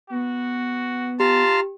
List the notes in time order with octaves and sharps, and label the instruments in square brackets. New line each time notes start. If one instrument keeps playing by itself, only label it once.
[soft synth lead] B3 [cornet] F#4
[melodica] F4 A#5 C6 [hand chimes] G4 [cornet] A5